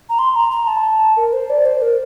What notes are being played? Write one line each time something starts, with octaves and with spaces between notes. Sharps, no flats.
A#5
C6
A#5
A#5
A5
A#4
C5
D5
C5
A#4